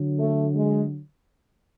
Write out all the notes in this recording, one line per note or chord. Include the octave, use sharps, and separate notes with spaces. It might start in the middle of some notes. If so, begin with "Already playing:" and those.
Already playing: D3 F#3
A3
G#3